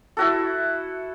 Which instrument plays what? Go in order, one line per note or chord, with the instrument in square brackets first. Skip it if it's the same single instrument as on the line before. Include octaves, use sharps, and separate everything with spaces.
[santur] E4 F#4 A4